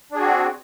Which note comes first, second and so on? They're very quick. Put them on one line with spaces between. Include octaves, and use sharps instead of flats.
D4 G#4 F#4 C4